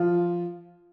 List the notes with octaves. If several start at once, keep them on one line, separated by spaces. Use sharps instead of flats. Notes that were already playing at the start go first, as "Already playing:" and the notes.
Already playing: F3 F4